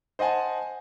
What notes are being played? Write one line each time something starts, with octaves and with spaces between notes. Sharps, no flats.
C5 D#5 F#5 G#5 A5